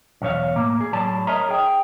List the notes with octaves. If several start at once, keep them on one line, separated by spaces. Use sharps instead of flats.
B1 E2 C#5 F5
A2 A#3
G#4
A2 F#3 D5 A5
A#4 C#5 D#5 E5 A#5
G#4 G5